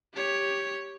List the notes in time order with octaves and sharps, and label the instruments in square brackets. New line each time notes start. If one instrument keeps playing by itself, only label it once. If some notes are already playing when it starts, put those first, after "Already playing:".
[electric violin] G4 C#5